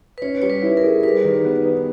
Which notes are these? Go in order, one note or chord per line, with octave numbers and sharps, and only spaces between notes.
B4
C#4 C#5
G3 C#5
B4
E4
A#4
G#4
G3 B4
D#3
B3
D#4